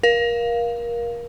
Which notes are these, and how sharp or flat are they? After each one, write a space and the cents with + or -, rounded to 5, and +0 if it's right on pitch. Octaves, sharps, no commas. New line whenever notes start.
A#4 +25 F5 +0